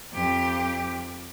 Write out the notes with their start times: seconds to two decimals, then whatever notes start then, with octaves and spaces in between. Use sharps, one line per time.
0.13 F2 G4